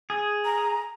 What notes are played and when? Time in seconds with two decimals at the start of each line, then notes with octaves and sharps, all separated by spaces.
0.10 G#4
0.45 A#5